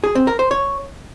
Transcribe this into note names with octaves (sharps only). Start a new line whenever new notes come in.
G#4
C4
A#4
C5
C#5